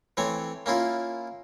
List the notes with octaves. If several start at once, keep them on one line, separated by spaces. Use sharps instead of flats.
E3 A3 C4 C#5
A#3 C#4 E4 F4